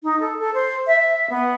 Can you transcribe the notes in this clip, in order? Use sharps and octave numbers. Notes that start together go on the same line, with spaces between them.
D#4
A4
A4
C5
E5
E5
B3